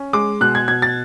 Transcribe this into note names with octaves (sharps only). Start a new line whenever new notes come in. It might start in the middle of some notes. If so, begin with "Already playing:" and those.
Already playing: C#4
G#3 D6
B2 F#6
G#6
B2 G#6
A6